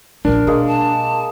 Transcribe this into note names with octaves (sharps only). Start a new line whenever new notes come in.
A#1 D#2 D4 A#4
B2 G#3 A#3 G#4
A5